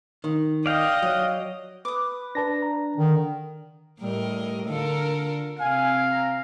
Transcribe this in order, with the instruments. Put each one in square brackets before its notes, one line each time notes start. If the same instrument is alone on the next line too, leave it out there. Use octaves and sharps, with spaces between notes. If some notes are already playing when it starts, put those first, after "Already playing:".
[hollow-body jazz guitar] D#3
[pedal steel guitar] D5 F5 G5 [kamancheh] D#5
[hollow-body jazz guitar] F#3
[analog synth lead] B4 [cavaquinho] D6 D#6
[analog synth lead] D4 [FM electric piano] B4 A5 A#6
[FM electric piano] A#5
[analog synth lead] D3 [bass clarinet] D#3
[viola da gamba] A2 A#4 D#5 [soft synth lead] G3
[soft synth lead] D3 [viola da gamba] F4 A4 A#4
[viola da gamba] C3 C4 [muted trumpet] F5 [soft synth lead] G#5
[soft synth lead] A#5